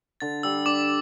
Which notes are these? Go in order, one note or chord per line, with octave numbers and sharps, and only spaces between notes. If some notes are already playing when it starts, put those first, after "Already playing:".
D3 A6
G3 E6
D4 D6